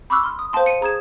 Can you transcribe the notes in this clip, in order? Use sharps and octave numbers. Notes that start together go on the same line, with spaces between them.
B5 C#6 D6 E6 F#6
C6 F6
D#6
C5 F5 G5 A5 C6
C#7 D#7
G#4 A#5 D#6 G#6 E7